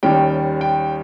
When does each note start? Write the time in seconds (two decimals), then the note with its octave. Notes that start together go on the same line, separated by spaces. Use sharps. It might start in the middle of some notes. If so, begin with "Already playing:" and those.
0.03 D#2 D#3 G3 C#4 G5
0.61 G5